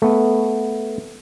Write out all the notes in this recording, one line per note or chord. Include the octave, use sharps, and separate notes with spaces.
A3 B3